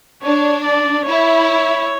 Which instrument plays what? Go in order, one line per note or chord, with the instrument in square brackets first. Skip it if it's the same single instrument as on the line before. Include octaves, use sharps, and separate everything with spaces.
[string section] D4 [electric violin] C#5
[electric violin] D5
[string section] E4 [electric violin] C#5